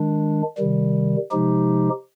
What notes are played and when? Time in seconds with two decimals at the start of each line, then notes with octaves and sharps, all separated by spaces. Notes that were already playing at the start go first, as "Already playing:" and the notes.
Already playing: D#3 G#3 D4
0.58 C3 D#3 G3
1.31 C3 F3 G#3 D#4 G4